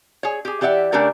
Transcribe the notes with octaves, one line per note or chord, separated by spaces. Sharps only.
G#4 C#5
G4 G#4
E3 G4 D5 E5 F#5
C#3 A3 D4 G4 A#4 D5